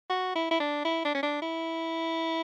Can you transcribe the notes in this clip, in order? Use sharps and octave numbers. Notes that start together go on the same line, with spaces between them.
F#4
E4
E4
D4
E4
D4
C#4
D4
E4